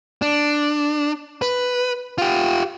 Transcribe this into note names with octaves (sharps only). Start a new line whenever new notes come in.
D4
B4
F4 G4